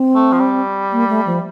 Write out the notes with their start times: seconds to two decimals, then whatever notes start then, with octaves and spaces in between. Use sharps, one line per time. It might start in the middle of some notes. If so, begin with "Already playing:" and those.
Already playing: C4
0.15 A3
0.32 F3
0.40 G3
0.92 A#3
1.09 A3
1.26 F3